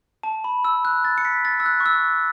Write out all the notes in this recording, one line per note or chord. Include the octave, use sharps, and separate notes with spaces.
A5
B5
E6
F#6
A6
C#7
B6
A6
E6
F#6
C#6
E6